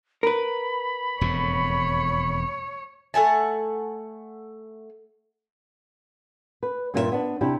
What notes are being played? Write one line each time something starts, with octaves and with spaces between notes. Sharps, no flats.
A#4 B4 B5
E1 F2 A2 C#5
A3 F#5 G#5 A5
B4
G2 A#2 A#3 F4 A#4 E5
B3 D4
C3 D4 E4 G4